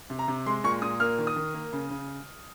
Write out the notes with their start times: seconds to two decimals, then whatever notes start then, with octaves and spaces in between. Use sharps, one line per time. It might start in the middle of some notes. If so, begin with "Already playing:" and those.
0.10 C3
0.19 A#5
0.28 C3
0.46 G#3 C6
0.64 A#2 C#6
0.82 A#2 D#6
1.00 A#3 F6
1.18 D#3
1.27 D#6
1.36 D#3
1.54 A#3
1.73 C#3
1.90 C#3